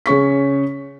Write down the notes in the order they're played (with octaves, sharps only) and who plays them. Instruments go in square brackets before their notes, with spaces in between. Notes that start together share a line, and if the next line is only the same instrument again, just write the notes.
[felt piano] C#3 C#4 C#6 B6